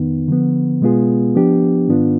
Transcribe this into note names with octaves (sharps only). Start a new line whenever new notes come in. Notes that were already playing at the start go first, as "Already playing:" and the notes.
Already playing: F2 D#3 B3 D#4
D3 F3 B3
B2 G#3 B3 F4 G#4
F3 B3 D4 G4
G#2 D#3 B3 D4 F4